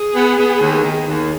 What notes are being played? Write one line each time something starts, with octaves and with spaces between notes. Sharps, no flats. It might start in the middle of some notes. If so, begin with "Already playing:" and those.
Already playing: G#4
B3
B3
D#2
D#3
D#2